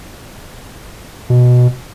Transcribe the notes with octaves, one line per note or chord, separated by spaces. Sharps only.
B2